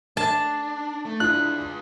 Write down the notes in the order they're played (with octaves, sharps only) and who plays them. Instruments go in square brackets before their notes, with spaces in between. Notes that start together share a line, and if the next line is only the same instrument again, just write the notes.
[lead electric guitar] D4 [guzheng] A5
[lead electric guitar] A3
[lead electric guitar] G#3 F4 [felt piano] D4 E4 [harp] F#6